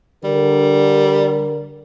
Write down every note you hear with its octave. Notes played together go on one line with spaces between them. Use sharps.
D3 G3 A#4